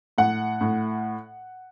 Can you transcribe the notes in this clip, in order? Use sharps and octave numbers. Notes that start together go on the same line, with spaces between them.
A2 F#5
A2